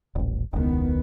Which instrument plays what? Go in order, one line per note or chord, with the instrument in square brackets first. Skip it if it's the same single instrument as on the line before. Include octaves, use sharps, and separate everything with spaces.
[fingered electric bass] D#1 A1
[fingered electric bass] E1 C#2 [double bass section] D#3 B3